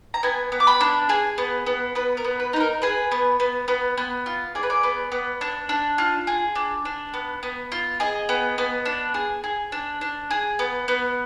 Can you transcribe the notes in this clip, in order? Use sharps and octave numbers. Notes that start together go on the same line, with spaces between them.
A#5
B3 G#5
B3
D6
B5
D4
G#4 G#5
B3
B3
B3 B4
A#4
B3
B4
D#4 B4
A#4
G#4 B4
B3
B3
B3
B3
F4
G#4 D5
B4
D5
B3
B3
D4
D4
F4
G#4
D4
D4
B3
B3
F4
G#4 D#5
B3
B3
D4
G#4
G#4
D4
D4
G#4
B3
B3